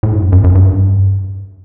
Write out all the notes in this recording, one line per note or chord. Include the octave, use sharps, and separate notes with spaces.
A2
G2
F#2
F#2
F#2
G2